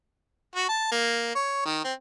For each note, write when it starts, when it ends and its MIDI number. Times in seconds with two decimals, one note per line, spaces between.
0.55 0.68 66
0.69 0.90 81
0.91 1.30 58
1.35 1.61 73
1.65 1.82 51
1.84 1.93 60